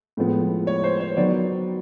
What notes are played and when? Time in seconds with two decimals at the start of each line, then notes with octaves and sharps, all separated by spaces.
0.17 A2 F3 G#3 B3
0.67 C#5
0.84 C5
1.00 C#5
1.17 D#3 F#3 B3 D5